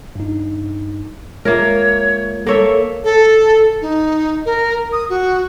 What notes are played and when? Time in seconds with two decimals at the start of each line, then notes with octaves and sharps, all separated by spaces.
0.15 G2 D#4
1.45 G#3 A#3 F4 A#4 C#5 E5
2.46 A#3 A4 C#5 E5
3.04 A4
3.81 D#4
4.46 A#4
4.92 D#6
5.10 F#4